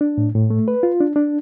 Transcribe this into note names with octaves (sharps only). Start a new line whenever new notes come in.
D4
A2
A2
A3
B4
F4
D4
D4